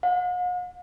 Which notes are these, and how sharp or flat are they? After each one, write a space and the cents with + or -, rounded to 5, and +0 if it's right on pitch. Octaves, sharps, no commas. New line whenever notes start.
F#5 -45